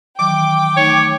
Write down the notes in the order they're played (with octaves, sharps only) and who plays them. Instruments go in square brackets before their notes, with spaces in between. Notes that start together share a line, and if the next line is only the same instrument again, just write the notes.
[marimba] D#3 E3 F#3 [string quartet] G5 [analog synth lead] D6
[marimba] A3 D#4 [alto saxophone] C#5